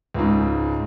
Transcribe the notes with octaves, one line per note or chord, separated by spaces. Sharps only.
C#2 G#2